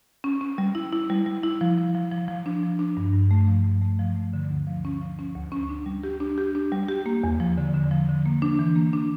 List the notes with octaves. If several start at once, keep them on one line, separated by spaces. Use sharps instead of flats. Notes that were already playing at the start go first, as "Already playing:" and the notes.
C#4
C#4
G3
E4
E4
G3
G3
E4
F3
F3
F3
F3
F3
D4
F3
D4
G2
G2
A3
F3
G2
A3
F3
A3
D3
D2
F3
C#4
F3
C#4
D2
C#4
D4
G3
G4
D4
G4
D4
G3
G4
A#3
E2
F3
D3
D3
F3
D3
A#3
D4
E3
A#3
D4